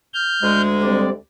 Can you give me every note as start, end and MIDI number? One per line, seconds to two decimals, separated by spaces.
0.14 0.62 89
0.14 0.62 91
0.42 1.15 38
0.42 1.15 56
0.83 1.10 55
0.83 1.10 60
0.83 1.10 74